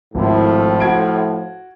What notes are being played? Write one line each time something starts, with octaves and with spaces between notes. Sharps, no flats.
G#1 A2 F3 E4
F#4 G#6 D7